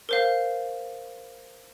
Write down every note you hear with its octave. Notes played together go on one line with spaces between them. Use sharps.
A#4 C5 F5